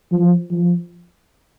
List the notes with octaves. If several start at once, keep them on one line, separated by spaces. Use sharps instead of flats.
F3
F3